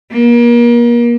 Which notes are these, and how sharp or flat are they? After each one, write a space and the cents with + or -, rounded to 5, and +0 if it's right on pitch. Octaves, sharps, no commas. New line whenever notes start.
A#3 +35